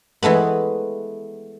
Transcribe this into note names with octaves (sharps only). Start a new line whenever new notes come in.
E3 G#3 A3 B3